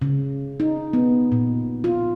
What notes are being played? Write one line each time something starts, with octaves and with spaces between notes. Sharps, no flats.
C#3
D#4
B3
A#2
F4